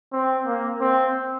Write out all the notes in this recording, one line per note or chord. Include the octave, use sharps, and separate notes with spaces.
C4
A#3
C4